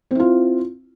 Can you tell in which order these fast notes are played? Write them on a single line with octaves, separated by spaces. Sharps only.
C4 E4 F4